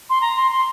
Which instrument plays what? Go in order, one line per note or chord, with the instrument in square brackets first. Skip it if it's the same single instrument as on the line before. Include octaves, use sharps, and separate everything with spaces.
[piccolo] C6
A#5
C6
C6